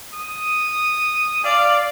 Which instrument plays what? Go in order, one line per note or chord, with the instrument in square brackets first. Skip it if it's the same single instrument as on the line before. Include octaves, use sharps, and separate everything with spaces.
[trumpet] D#6
[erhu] D5 [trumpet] F5